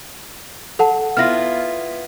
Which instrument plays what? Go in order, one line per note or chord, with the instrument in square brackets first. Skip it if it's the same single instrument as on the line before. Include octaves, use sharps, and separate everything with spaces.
[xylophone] A4 F#5 A5
[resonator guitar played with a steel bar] B3 E4 F4 [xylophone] F6 A#6